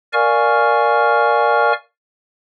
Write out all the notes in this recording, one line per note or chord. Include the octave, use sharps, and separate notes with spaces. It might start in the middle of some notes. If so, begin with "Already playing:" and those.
A#4 D5 F5 G#5 C#6 F6